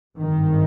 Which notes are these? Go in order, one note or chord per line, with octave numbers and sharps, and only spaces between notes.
G#1 G2 D#3